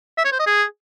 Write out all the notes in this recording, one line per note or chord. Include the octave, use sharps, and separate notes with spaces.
E5
C#5
C5
D#5
G#4